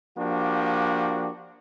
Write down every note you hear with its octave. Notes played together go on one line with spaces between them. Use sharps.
F3 A#3 D4 F#4 G4